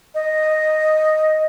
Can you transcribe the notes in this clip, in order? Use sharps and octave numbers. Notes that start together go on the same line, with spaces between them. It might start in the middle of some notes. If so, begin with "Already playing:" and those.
D#5